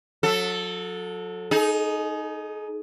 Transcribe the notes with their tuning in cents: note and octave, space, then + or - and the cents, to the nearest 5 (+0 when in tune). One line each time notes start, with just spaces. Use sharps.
F#3 -35 A4 +0
D#4 +0 G#4 +35